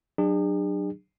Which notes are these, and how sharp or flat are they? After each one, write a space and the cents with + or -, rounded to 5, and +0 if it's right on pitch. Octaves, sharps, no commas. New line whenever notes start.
F#3 +15 D4 +35 G#4 -45